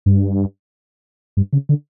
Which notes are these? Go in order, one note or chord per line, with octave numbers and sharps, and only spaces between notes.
G2
G2
C#3
D3